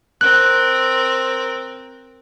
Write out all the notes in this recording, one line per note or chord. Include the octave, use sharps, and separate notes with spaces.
C4 A#4 F#6